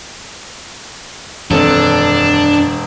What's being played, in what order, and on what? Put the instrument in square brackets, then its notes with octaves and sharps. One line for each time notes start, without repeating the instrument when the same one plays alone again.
[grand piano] E1 A4 [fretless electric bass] F#2 D#3 C4 [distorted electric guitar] D4